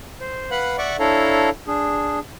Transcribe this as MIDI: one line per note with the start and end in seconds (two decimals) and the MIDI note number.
0.20 0.50 72
0.51 0.76 71
0.51 0.76 77
0.51 0.76 78
0.51 0.76 83
0.51 0.76 90
0.78 0.97 74
0.78 0.97 76
0.78 0.97 78
0.78 0.97 85
0.78 0.97 86
0.99 1.50 62
0.99 1.50 64
0.99 1.50 69
0.99 1.50 73
0.99 1.50 77
0.99 1.50 82
1.67 2.19 62
1.67 2.19 68